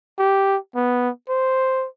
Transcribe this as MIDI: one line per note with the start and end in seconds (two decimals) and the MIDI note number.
0.18 0.57 67
0.75 1.09 59
1.29 1.87 72